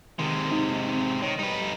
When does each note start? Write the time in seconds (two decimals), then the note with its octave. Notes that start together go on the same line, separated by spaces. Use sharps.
0.19 C3 D#3 G#3
0.52 D#4
0.88 C4
1.22 D#3 C#5
1.39 G3 D#4 B4